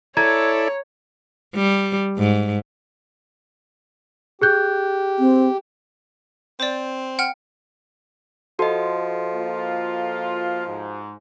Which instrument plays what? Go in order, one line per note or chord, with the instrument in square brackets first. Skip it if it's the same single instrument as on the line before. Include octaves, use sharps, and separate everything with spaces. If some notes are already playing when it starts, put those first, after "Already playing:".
[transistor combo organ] E4 A4 D5 [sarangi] C#5 [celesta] A#5 G#6
[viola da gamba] G3
G#2
[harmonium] G4 [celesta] G#4 F#6 G6
[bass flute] C4
[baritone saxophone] C4 [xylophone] C5 D5
[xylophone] F#5 G5 F6
[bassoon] F3 [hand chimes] F#4 D#5 [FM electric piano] A4 C6
[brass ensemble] A#3 F4
G#2